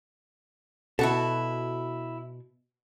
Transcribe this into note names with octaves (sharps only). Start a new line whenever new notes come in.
B2 E4 F#4 A4